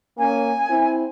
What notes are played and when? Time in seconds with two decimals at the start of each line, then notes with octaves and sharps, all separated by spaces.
0.18 A#3 C#4 G#5
0.69 C4 E4